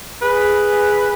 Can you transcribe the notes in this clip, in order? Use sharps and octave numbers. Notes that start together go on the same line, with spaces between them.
G#4 B4